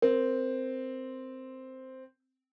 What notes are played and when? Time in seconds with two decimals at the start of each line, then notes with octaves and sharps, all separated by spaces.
0.02 C4 A#4